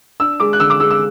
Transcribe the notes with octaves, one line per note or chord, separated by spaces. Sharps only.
D4 E6
G#3 D6
F#6
D3 E6
D6
G#3 E6
E6